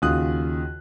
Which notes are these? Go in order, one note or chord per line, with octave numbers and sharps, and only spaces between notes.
D#2 C#3 F4 F#4 D#6 F#6